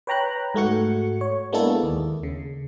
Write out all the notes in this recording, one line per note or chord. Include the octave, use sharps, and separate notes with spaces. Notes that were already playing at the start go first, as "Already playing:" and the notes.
B4 C#5 G5 A#5 B5 F#6
G#2 A3 F#4 C#7
C#5
G#3 A#3 B3 D4 E4 A4
D#2
C#3